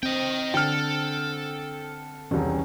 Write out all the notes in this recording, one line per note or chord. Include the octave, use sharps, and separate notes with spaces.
C4 D#5 G5
D3 A4 G5 F6
E1 C2 D#3 C#4